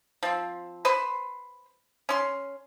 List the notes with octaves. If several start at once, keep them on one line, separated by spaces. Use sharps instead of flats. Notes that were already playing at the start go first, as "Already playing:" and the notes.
F3 C4
B4 C5 C6
C#4 C6